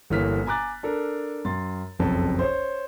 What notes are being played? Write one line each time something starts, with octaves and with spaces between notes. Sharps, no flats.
G1 E3 A#3 C#5 F6 B6
G#5 A#5 D6 F#6 A6
D4 A4 A#4
F#2 C6 A6
F#1 B1 F2 A5
C5 C#5